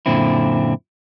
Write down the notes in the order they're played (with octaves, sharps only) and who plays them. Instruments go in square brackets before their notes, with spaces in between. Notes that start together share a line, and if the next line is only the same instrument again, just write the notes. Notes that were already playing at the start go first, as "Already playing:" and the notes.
[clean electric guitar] F#2 A#2 D3 C4 E4